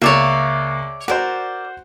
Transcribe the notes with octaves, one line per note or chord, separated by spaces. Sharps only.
C#2 A#3 C#5 D5 E5
F#4 A#4 C5 D5